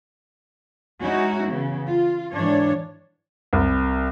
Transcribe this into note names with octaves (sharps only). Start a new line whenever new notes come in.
G#3 C#4 D#4 E4 F#4
C#3 E3 B3
F4
G#2 E3 D4 C#5
C2